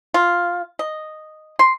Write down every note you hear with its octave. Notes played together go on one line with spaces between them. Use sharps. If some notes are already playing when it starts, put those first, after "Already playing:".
F4
D#5
C6